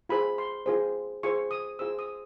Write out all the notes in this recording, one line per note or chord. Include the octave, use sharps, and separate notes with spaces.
F4 G#4 C5 B5
C6
F4 G#4 C5
F4 G#4 C5 C#6
D#6
F4 G#4 C5 E6
D#6